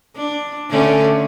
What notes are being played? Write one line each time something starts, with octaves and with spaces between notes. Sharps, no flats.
D4
D3 A3 C#4